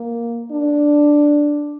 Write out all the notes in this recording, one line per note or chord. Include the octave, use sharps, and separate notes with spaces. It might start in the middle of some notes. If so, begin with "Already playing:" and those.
Already playing: A#3
D4